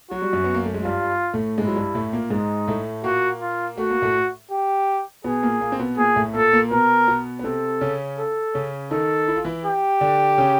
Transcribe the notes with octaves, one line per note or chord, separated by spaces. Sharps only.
F#3 F#4
G3
F#2 F#3
B3
A#3
A3
G#3
G2 G3 F4
A2 A3
G#2 G#3 E4
F#3
G2 G3
A2 A3
A#2 A#3
G#2 G#3 D#4
A2 A3
A#2 A#3 F#4
F4
A3 F#4
A#3
A2 A3
G4
B2 B3 G#4
A#2 A#3
A#2 A#3
C4
B2 B3
A#2 A#3 G#4
A2 A3
A3
A#2 A#3 A4
A#2 A#3
B2 B3 A#4
B2 B3
B3
C3 C4 A4
C#3 C#4
A4
C#3 C#4
D#3 D#4 A4
E4
F4
E3 E4
G4
D3 D4
C#3 C#4